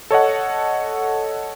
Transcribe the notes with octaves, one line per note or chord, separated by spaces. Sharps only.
A4 C#5 D#5 F#5